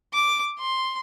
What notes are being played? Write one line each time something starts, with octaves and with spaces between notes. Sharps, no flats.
D6
C6